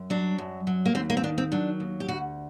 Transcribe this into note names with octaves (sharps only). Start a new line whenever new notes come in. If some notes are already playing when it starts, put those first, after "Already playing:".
Already playing: F#2
F#3 D4
F#2
F#3
A#3
D#2 C4
A#3
C4
D#3 D4
C4
F#3 D4
D#2
G4
D2 F#4